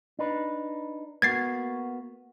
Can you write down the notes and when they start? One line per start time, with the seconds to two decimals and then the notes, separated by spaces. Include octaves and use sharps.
0.19 D4 D#4 B4
1.22 A#3 B3 F#4 G#6 A6 C7